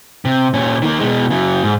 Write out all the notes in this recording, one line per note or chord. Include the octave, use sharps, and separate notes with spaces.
C3
A#2 C#4
D#3 A#3
B2 G#3
C#3 F#3
G#2